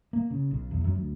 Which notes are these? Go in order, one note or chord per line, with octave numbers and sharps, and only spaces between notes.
A#3
C#3
B1
E2
F#2
D2